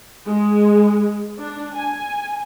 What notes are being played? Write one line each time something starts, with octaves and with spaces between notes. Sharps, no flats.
G#3
D4
G#5